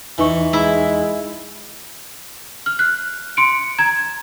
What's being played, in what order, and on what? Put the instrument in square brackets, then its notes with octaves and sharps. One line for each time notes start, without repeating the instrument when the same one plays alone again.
[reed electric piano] E2 D#4 C#6 [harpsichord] E3
[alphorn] G#3 [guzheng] E4
[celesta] F6
F#6
C6 C#7 D7
A#5 G#6